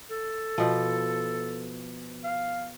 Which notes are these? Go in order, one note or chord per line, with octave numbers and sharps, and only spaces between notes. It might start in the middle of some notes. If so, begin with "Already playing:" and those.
A4
B2 F3
F5